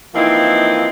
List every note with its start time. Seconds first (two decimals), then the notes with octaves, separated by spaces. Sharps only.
0.15 E3 F3 A#3 C4 D#4 E4